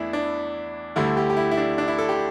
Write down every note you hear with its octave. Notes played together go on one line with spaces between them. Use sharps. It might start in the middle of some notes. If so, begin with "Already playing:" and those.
Already playing: E2 E3 A3 D4 E4
D4
D2 D3 G3 E4
G4
G4
E4
E4
D4
D4
E4
A4
G4